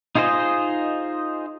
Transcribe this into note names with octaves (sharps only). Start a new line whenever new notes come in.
D#4 F4 G#4 C5 D#5